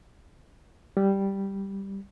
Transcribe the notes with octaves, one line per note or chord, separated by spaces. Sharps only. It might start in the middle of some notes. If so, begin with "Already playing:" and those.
G3